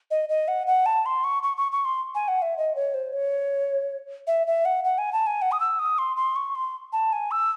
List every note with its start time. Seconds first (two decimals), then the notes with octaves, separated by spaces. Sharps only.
0.11 D#5
0.29 D#5
0.48 F#5
0.67 F#5
0.86 A5
1.06 C6
1.24 C#6
1.43 C#6
1.57 C#6
1.72 C#6
1.85 C6
2.15 G#5
2.28 F#5
2.42 E5
2.58 D#5
2.76 C#5
2.94 C5
3.13 C#5
4.27 E5
4.47 E5
4.65 F#5
4.84 F#5
4.98 G#5
5.13 A5
5.27 G#5
5.42 F#5
5.52 D#6
5.60 E6
5.79 D#6
5.98 C6
6.17 C6
6.36 C#6
6.55 C6
6.93 A5
7.13 G#5
7.31 E6